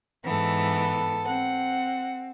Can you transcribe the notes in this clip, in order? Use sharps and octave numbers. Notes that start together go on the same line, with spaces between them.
G#2 E3 B3 A4
C4 F#5